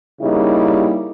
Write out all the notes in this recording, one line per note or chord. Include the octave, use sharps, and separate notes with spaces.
C#3 G3 A#3 D#4 E4 G4